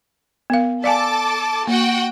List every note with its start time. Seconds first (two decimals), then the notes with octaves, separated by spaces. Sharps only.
0.50 B3 A#4 F5
0.84 A4 D5 F5 G#5 A5 D6
1.67 A#3 F#4 F#5 G5